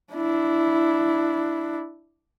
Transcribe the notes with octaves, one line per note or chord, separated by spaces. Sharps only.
D4 E4